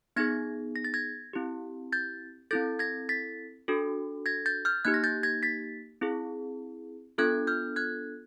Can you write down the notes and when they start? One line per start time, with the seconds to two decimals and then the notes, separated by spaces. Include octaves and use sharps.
0.16 B3 D#4 G#4 G#6 A#6
0.76 A#6
0.84 A6
0.94 G#6 A#6
1.33 C4 E4 G4
1.92 G6 A6
2.51 C4 E4 A4 G6 A6
2.79 G#6 A#6
3.09 A6 B6
3.68 D4 F#4 A4
4.26 G#6 A#6
4.46 G6 A6
4.65 F6 G6
4.85 A#3 D#4 G4 F#6 G#6
4.94 A#6
5.04 G6 A6
5.23 G#6 A#6
5.43 A6 B6
6.01 C4 E4 G#4
7.18 B3 D4 F4 A4 F#6 G#6
7.47 F6 G6
7.76 F#6 G#6